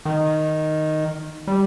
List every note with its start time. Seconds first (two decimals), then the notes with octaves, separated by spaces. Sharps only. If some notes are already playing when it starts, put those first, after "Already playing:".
0.05 D#3
1.47 G3